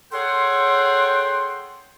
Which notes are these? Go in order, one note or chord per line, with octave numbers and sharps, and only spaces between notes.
G#4 A4 C#5 F#5 G5 C6